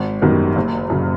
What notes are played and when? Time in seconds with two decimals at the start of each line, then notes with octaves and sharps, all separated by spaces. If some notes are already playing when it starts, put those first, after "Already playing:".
Already playing: G#1
0.22 F#2 D#3 G3 B3
0.56 F#1
0.90 F#2 C#3